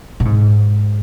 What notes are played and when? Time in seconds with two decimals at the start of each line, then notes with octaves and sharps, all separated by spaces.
0.20 A#2
0.25 G#2